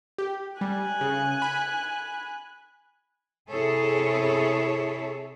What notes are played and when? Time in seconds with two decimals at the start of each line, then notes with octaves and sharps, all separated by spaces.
0.18 G4
0.61 G3 G#5 F#6
1.01 C#3
1.42 B5
3.50 C3 E4 G#4 A4 C#5